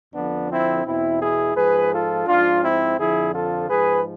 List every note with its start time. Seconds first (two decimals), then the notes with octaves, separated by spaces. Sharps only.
0.13 F2 D3 F3 B3 D4
0.49 C4 E4
0.85 E2 B2 C4 E4
1.20 E4 G#4
1.56 G#2 F3 G#4 B4
1.91 F4 A4
2.27 G#2 F3 D4 F4
2.62 C4 E4
2.98 F2 D3 F3 E4 G#4
3.34 F4 A4
3.69 G#2 F3 G#4 B4